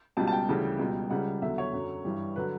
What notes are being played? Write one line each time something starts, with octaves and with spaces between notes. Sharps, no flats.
C#2 B2 G3 A5
A5
G5
D2 C#3 E3 G3
C#2 B2 G3
C#2 C#3 G3 F#5
E2 D3 F#3 E5
C#5
F#2 D3 F#3
G2 E3 G3
D3 F#3 B4